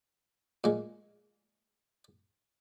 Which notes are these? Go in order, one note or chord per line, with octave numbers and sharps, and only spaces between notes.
A#2 G#3